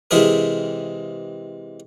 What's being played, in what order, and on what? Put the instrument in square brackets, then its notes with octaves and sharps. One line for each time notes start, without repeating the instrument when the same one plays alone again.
[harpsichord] C3 E3 G#3 G#4 A#4